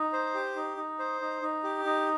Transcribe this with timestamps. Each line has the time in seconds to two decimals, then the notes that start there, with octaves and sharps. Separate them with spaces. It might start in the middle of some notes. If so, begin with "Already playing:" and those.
Already playing: D#4
0.13 C5
0.34 G4
0.56 D#4
0.77 D#4
0.99 C5
1.21 D#4
1.42 D#4
1.64 G4
1.85 D#4